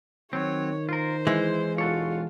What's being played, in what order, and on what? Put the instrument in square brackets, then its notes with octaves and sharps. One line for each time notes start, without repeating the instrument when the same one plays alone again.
[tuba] D#3 [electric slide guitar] F#3 C4 [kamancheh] C#5
[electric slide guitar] F4 A#4 [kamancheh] C5
[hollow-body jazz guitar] E3 G#3 [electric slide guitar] E4
[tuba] E1 [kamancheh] F4 [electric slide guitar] F#4 A4 C#5